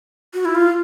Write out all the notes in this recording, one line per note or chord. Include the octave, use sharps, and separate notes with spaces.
F#4
E4
F4